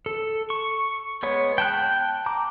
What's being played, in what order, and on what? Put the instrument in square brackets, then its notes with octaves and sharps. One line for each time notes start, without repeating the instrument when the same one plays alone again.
[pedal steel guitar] A4
C#6
G#3 B3 C#5
G5 A5 F#6
A#5 D6